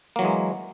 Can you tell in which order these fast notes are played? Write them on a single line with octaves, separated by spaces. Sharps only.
A#3 F#3 E3 G#3